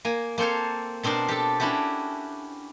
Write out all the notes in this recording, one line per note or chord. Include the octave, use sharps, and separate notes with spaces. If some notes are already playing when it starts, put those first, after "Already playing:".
A#3 G#5
A#3 C4 A4 C5 C#5
B2 C4 D4 A#4 C5
G4 A4
C#4 D4 E4 F#4 G4